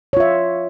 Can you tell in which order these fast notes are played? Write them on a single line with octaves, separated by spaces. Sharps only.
C#5 F4 E5